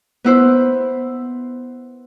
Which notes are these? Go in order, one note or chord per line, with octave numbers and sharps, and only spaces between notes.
B3 E4 C5